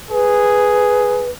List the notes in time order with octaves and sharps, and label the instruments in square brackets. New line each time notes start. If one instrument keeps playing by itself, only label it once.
[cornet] G#4 [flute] B4